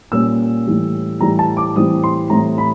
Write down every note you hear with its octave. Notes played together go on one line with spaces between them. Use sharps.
A#2 G3 A#3 C#4 E6
A2 E3 G3
A2 E3 G3 A#5
A5
D6
A2 E3 G3 C4 D#6
C6
A2 E3 G3 C4 A#5
B5